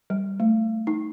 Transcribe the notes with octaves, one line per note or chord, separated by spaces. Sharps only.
G3
A3
D#4